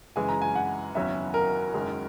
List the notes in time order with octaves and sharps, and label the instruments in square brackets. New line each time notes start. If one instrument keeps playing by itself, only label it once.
[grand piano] F#2 C#3 E3 G#3 [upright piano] G#5
[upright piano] A#5
G#5
F#5
[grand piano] F#1 E2 D#3 F#3 C#4 [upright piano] E5
[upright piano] A#4
[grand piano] F#1 F#2 D#3 G#3 C#4